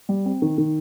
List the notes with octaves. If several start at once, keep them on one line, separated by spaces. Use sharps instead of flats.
G3
C4
D#3
D#3